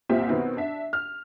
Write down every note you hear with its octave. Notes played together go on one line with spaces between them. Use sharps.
C2 A#2 C4 F4 G4 E5
B2 D#3 B3 C4
D4 E5
F6